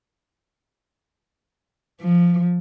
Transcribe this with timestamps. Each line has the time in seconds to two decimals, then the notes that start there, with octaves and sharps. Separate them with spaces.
2.01 F3